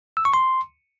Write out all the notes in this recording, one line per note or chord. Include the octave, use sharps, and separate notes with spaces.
E6
C#6
C6